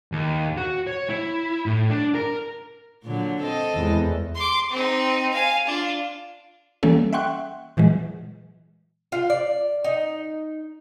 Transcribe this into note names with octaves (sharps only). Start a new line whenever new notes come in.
D#2
F#4
C#5
E4
A2
D4
A#4
A#2 D3 F#3
C4 A4 D#5
E2 E3 G#3
C6 D6
C4 D#4
F5 G#5
D4 F4
E3 G3 A#3 C#4 A4
E5 F#5 G5 C6 C#6 F#6
A#2 E3 F#3 G#3
F4
D5
D#4